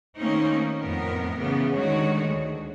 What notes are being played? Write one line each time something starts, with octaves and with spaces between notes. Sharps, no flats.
D#3 A3 A#3 C4 C#4 D#4
F2 A2 B3 A#4
C#3 E3 B3
D3 D#3 G#3 A3 F#4 C#5
D2